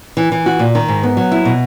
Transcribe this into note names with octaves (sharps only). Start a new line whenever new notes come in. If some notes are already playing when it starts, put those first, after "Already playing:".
E3
E3
F#4
A#2
D#3
G#2
B3
F#3
E4
B2